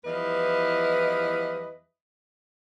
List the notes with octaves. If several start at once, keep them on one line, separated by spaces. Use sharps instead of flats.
E2 F3 G3 E4 B4 D#5